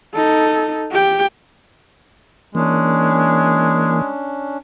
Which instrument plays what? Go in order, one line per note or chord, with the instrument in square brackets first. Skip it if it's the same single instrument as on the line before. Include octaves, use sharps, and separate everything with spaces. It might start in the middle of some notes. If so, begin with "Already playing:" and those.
[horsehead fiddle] D#4 A4
G4 G5
[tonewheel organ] E3 A#3 [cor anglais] G#3 [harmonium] C#4 D4